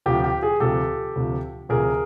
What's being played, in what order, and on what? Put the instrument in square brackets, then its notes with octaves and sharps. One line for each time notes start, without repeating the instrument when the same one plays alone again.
[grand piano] D2 C3 F3 G4
G4
G#4
D2 C3 F3 G4 A4
D2 C3 F3
D2 C3 F3 G#4 A#4